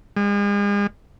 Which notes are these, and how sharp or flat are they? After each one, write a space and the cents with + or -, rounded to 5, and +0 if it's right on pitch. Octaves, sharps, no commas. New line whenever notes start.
G#3 -40